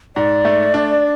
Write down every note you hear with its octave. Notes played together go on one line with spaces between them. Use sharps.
G#2 D5
A3
D4